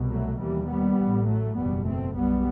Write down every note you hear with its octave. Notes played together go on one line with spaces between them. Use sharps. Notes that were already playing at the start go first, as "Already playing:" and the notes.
Already playing: C2 B2
F#3 A3
D#2 E3 G3
G3 B3
A1 A2
F#3 A3
F#1 E2 B2 G3 B3
A3 C4
B1 B2 G3 B3